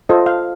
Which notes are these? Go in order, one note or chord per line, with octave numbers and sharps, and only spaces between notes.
F4 A4 C5 D#5
F5